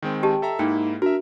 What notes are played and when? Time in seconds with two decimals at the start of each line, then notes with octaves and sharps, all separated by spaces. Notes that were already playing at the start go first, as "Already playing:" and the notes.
0.02 D#3 G#3 C4
0.23 G4 D#5 G5 A5
0.42 A4 E5 A#5
0.59 G#2 A#3 D#4 E4 G5
1.02 D4 F#4 A#4 E5